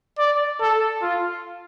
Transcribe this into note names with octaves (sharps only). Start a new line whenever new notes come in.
D5
A4
F4